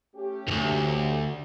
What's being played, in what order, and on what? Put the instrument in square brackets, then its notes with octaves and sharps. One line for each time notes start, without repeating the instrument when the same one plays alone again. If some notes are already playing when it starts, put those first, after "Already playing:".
[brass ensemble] A3 C#4 G4
[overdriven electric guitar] D2 G#2